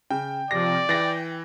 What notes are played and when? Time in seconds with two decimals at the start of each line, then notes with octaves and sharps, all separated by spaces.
0.11 C#3 G5
0.51 C3 F3 D5 A#6
0.89 E3 G5 A6 A#6